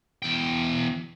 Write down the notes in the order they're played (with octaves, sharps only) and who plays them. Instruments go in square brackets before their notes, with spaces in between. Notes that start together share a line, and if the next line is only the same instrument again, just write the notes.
[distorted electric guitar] E2 G5